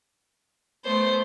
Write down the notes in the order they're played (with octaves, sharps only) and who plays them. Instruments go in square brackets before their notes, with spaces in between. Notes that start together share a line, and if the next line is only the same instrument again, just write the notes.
[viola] A3 B3 [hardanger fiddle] C5